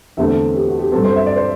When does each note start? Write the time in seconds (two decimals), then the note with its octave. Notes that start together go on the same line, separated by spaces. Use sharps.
0.17 E2 D3 A3 C4 E5
0.55 G4
0.67 F#4
0.79 G4
0.92 G2 F#3 C4 A4
1.04 C5
1.16 E5
1.26 D5
1.36 C5